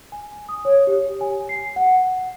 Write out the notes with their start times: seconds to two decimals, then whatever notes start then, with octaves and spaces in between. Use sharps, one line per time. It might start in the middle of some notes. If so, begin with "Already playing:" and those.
0.12 G#5
0.49 D#6
0.65 C#5
0.87 G4
1.21 G#5
1.49 C7
1.76 F#5